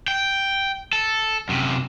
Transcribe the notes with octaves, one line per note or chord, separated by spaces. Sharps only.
G5
A4
F#2 C3